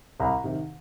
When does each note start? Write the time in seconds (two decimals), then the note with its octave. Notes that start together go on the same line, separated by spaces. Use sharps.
0.20 C2 A#5
0.44 C3 D#3